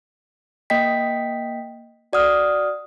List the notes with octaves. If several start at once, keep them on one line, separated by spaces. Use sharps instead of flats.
A#3 D#5 G5 B6
F#4 D5 F#5 D#6 F6